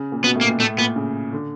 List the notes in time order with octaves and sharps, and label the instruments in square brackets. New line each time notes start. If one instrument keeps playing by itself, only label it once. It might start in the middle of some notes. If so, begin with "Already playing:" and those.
Already playing: [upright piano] C#3
A#2
[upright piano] B2 [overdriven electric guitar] B3
[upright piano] A2
[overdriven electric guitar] A#3
[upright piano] A#2
[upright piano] A2 [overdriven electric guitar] A3
[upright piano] A#2 [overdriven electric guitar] B3
[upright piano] C#3
D3